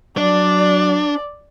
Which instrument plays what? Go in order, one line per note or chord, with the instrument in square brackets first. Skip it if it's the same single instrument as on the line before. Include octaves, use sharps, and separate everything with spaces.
[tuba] F#3 [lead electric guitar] D4 [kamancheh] D5